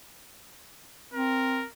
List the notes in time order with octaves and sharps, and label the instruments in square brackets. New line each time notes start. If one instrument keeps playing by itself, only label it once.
[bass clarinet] C4 [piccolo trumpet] A#4